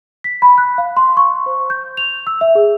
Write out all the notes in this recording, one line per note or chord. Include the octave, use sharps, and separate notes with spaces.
B6
B5
F#6
F5
C6
C#6
C5
G6
F7
E6
E5
G#4